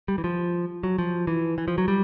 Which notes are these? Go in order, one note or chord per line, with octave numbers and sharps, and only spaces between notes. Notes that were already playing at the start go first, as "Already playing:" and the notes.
G3
E3
F3
F#3
F3
E3
E3
F3
F#3
G3